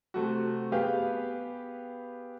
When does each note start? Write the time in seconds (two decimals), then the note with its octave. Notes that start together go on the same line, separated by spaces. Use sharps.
0.14 C3 A3 F#4
0.72 B3 G4 G#4 B4 F5 G5